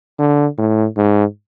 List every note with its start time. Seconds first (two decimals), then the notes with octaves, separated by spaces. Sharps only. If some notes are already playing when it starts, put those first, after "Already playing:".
0.19 D3
0.58 A2
0.97 G#2